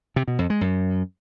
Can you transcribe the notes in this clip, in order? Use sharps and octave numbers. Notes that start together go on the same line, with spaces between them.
C3
B2
F2
G#3
F#2